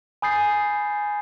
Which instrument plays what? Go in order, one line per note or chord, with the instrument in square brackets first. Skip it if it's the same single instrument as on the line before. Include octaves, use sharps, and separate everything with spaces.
[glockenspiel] G#5 B5 D#6 G6 A6 C7